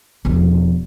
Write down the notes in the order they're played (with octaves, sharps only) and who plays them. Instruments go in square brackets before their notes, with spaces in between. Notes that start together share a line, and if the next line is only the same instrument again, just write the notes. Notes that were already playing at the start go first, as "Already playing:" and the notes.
[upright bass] E1 F3